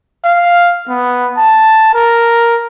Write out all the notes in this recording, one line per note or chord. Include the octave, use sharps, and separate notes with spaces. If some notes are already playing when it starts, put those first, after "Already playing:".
F5
B3
A5
A#4